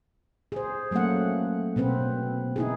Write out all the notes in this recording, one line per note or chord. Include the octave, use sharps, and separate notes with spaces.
G#4 C5
F#3 A3 A#3 C#4 F#5
B2 B3 C4 B4
D#4 E4 G#4